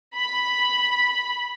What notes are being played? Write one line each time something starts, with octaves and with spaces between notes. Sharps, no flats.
B5